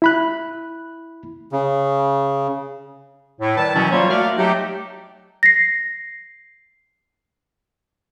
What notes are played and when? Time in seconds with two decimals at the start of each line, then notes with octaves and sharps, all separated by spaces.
0.02 E4 B5 F#6
1.52 C#3
3.40 A2
3.57 D#3 G3 B4 A5
3.75 B2 D#3 E3 F#3 C#4 E4
3.92 F#3 G3 A#3 F4 C5 C#5
4.09 A3 A#3 F#4 A#4 D5 F5
4.37 F#3 A3 D#4 G4
5.43 A#6 C7